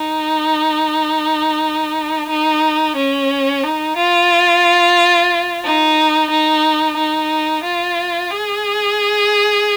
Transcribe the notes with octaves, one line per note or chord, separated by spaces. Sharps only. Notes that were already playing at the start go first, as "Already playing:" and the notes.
Already playing: D#4
D#4
C#4
D#4
F4
D#4
D#4
D#4
F4
G#4